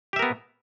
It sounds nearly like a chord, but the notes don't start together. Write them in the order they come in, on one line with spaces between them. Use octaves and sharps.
G4 E5 A#4 B3